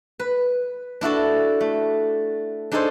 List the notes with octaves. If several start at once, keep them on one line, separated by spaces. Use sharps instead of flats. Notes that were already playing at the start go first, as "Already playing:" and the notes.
B4
D4 E4 F#4 A4
A3
D4 D#4 G#4 A4 C5 C#5